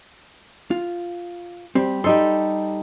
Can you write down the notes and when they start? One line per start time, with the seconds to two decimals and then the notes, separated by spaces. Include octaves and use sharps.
0.71 F4
1.75 G3 C4
2.04 G3 D#4 A4 C6